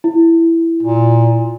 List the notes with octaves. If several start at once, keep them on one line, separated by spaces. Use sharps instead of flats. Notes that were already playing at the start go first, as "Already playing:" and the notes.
E4
A#2